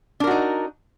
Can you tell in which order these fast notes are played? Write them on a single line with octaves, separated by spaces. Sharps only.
D4 A#4 F#4 D#4